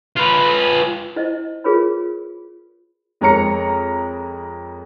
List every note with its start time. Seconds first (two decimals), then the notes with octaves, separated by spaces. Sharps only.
0.17 F4 B4
1.16 E4 C5 D#5
1.64 F4 G#4 A#4 B4 C#5 B5
3.21 F2 G#3 A#4 C#5 A#5 C#7